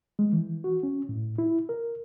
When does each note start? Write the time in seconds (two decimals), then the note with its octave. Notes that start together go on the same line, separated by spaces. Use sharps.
0.19 G#3
0.33 E3
0.64 F#4
0.83 C#4
1.09 A2
1.38 E4
1.69 A#4